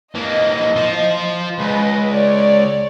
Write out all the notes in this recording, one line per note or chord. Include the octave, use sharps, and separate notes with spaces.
E3 A#3 D#5
F4 C5
C#2 B4 D#5
C#5 D5